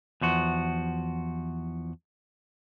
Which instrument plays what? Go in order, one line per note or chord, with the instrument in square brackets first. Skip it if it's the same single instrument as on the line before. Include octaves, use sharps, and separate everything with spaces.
[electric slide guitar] E2 F3 F#4